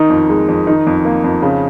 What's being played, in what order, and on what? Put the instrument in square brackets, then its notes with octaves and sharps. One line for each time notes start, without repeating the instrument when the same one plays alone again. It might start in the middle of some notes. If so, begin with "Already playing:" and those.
Already playing: [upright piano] D#3 D#4
F2
G#3
F2
D#3 D#4
F2
A#3
F2
C#3